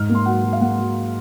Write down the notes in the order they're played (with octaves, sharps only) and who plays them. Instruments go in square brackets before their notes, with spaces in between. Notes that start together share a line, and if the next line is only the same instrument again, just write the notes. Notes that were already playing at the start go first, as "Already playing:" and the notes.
Already playing: [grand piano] G#2 F6
A#3
C6
F#3 F#5
F#3
F5
A#3 F#5
F#3